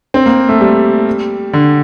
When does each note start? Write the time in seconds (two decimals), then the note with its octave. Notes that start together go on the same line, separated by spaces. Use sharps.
0.14 C4
0.26 A#3
0.49 A3
0.61 G3
1.53 D3